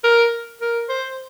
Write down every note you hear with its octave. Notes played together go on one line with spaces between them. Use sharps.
A#4
A#4
C5